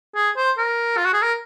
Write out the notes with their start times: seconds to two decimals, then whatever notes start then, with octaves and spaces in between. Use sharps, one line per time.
0.16 G#4
0.37 C5
0.58 A#4
0.98 F4
1.05 F#4
1.14 G#4
1.22 A#4